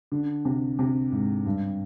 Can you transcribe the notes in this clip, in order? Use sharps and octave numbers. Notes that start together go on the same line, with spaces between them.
D3
C3
C3
G#2
G2